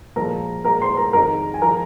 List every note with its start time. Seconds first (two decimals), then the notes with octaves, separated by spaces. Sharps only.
0.16 A#2 F3 G#3 A#4 A#5
0.64 A#2 G#3 A#4 A#5
0.81 C5 C6
0.97 A#4 A#5
1.13 F2 D#3 G#3 A#4 A#5
1.54 G#5
1.62 F3 G#3 A#4 A#5